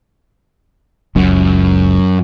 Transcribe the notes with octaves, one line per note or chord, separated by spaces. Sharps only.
F#1 C#2 F#2 C#4